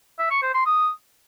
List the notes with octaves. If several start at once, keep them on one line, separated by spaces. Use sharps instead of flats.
E5
C#6
C5
C6
D#6